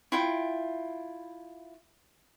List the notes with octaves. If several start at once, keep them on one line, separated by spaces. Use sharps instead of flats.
E4 F4 G5